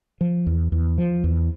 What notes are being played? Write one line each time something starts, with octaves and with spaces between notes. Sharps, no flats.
F3
E2
E2
F3
E2